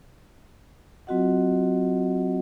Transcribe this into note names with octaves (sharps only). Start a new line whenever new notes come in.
F#3 C4 F4 F#4 D#5 F#5